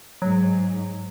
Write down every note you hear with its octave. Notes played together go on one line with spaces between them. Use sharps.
G#2 F#3